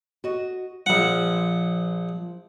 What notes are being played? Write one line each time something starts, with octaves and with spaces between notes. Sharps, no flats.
F#4 D#5
A#1 F3 F4 F#5